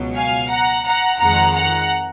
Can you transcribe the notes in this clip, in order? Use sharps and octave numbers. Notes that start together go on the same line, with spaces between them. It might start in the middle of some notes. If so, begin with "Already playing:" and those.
Already playing: C#2 B2 F#3
F5 G#5
F#5 A#5
F#5 A#5
F2 D#3 G#3 F#5 A#5
F#5 A#5